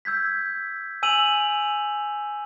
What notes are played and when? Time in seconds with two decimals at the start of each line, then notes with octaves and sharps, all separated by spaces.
0.05 E6 G6 G#6 B6
1.03 G#5 E6 D#7 F7 F#7